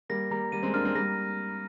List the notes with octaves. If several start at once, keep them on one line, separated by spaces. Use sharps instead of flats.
G3 A#3 A#6
G3 A#3 A#5
G3 A#3 D#7
G#3 C4
A#3 D4 F6
G#3 C4
G3 A#3 A#6